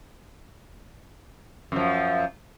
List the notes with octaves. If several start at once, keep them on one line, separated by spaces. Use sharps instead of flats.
F#2 F3